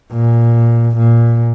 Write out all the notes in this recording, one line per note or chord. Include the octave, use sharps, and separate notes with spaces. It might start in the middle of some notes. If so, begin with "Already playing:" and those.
A#2
A#2